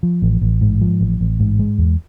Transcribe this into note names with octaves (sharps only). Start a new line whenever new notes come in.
F3
A1
A1
G#2
F3
A1
A1
G#2
G#3
E2